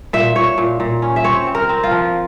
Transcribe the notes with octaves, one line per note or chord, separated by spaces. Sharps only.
A#2 E5
A#2 C#5
A#2
A#2
C#4
E5
C4 C#5
C4
A#4
C4
F4
F3